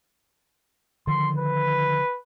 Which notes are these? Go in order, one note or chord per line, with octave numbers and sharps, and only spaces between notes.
D3 D#3 F3 C6
B4